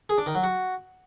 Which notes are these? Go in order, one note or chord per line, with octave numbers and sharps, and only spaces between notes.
G#4
D4
D#3
F#3
F#4